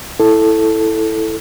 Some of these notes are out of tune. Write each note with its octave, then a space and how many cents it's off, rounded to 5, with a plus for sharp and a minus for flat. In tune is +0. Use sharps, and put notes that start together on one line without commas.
E4 +0 A4 +0